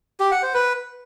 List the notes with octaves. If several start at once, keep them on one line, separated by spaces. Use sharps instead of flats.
G4
F#5
C5
B4